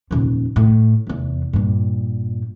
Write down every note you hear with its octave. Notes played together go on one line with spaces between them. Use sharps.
D#1 F2
A2
F1 E2
G2 A#2